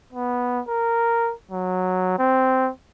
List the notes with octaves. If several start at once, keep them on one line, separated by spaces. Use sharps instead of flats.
B3
A#4
F#3
C4